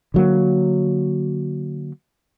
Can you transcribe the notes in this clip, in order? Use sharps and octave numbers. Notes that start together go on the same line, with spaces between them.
D3 F#3 A#3